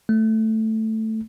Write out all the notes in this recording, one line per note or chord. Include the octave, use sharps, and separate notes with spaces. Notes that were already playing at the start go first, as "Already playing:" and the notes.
A3